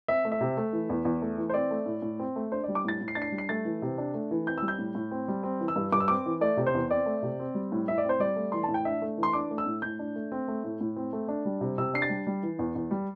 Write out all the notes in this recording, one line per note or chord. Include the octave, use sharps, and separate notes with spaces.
C4 E5
A3
E5
C3
A3
E3
E2
E2
A3
E3
C5
C4 D5
A3
A2
A2
C4
A3
D4 C5
D5
G3
D6
A2 A6
A2
C7
D4 A6
C7
G3
C7
A3 A6
E3
C3
D4
A3
E3
C4 G6
G3 E6
G6
A2
A2
C4
G3
C4
E3
E6
G2
G2 D6
E6
C4 D6
E3
A3 D5
C3
C5
E2
C4 D5
A3
C3
C4
G3
A2
A2 E5
D5
C4 C5
G3 D5
A3
E3 C6
A5
A2
G5
D4 E5
A3
E3
C6
D4 D6
A3
E6
A2
A2 G6
D4
A3
C4
A3
A2
A2
C4
A3
D4
G3
C3
C3 E6
D4 C7
A6
G3
G3
E3
E2
E2
G3